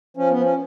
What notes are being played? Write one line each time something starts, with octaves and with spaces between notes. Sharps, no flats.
F3 C#4
B3
F3
C#4